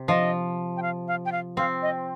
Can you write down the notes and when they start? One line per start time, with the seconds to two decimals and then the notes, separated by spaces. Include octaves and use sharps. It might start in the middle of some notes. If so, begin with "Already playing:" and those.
Already playing: C3
0.08 F3 D#5
0.77 G5
0.82 F5
1.08 F5
1.25 G5
1.32 F5
1.57 C4 F5
1.82 D#5